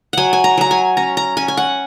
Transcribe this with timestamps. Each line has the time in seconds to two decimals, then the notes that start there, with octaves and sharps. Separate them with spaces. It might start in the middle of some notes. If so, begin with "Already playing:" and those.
0.13 F#3 F#5 G#5
0.33 G#5
0.44 A#5
0.57 F#3 A#5
0.71 G#5
0.97 C#4 A#5
1.17 A#5
1.37 C#4 G#5
1.48 G#5
1.57 F#5